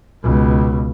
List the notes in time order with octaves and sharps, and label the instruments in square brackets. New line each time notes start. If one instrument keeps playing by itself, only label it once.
[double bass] C#2 B2